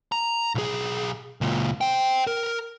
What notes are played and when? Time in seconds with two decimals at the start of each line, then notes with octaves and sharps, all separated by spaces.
0.12 A#5
0.55 B1 G#4
1.41 C#2 A#2
1.81 C5 G5
2.27 A#4